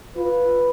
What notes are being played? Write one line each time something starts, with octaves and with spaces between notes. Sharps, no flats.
F4 B4